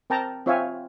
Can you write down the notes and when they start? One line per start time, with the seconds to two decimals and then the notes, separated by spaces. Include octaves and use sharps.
0.10 C4 A#4 G5 A5 A#5
0.46 C4 F4 C#5 E5 F5 G#5